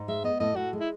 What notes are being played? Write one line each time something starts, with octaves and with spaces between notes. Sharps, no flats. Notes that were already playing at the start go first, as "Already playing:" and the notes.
Already playing: G#2
G#3 E5
B3 D#5
A2 D#5
A2 F#4
G#3
E4